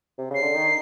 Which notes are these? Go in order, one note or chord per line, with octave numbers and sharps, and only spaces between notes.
C3
C#3 C7
D3
D#3